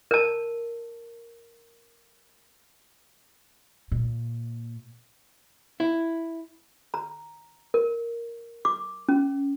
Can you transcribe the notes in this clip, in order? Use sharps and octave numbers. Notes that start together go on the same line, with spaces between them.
A#4 A5
A#2
E4
A#5
A#4
D6
C#4